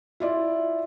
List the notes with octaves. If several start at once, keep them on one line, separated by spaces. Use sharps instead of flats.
E4 F4 D5